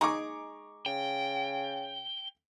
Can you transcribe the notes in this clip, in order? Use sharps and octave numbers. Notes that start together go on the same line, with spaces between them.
G#3 D#4 G#4 A#5 C#6 D6
C#3 G5